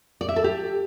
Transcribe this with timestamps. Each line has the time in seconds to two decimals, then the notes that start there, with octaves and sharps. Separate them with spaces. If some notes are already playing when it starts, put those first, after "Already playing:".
0.21 D5
0.29 E5
0.36 A4
0.44 G4